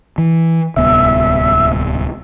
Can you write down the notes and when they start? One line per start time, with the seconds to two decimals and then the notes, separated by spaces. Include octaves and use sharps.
0.18 E3
0.76 D1 C2 B3 E5